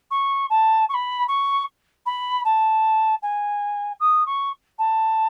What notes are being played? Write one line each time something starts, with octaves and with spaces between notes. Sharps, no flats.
C#6
A5
C#6
B5
C#6
B5
A5
G#5
D#6
C#6
A5